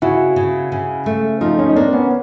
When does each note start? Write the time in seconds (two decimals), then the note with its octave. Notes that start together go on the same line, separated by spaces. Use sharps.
0.02 C#3 E4 F#4
0.36 C#3
0.72 C#3
1.06 A3
1.41 F3 D#4 F4
1.58 C#4 D#4
1.69 D#4
1.76 A#3 C4 D4
1.93 B3 C#4
2.04 B3